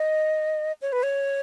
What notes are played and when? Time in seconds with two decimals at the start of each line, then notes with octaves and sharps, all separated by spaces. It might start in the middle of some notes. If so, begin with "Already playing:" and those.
Already playing: D#5
0.82 C#5
0.92 B4
1.03 C#5